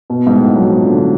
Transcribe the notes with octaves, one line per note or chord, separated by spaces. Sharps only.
B2
G#2
A2
F#3
F3
D3